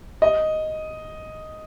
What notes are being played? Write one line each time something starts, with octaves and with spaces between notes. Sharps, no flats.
D#5